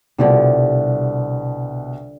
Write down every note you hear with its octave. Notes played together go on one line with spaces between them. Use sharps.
C2 B2 D3 F3 G3